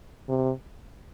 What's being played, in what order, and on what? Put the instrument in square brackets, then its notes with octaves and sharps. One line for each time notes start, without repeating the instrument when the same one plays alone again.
[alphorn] C3